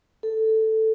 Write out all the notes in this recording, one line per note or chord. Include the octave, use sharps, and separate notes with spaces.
A4